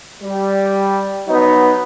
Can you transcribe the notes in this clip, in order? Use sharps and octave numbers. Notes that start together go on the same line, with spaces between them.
G3
F#3 B3 D#4